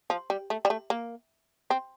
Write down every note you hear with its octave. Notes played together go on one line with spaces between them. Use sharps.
F3
G3
A3
G3
A3
A#3
C4